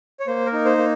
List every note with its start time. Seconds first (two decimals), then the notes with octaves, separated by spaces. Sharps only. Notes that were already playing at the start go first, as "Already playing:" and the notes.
0.20 C#5
0.27 A#3 C5
0.46 A#4
0.53 D#4
0.65 C5
0.78 A#3